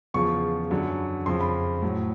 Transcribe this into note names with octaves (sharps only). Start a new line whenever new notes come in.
E2 C#3 F3 C#6
F#2 D3 F#3
F2 C#3 F3 C6
B5
A2 F#3